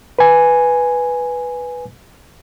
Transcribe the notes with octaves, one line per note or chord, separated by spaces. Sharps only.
B4 G#5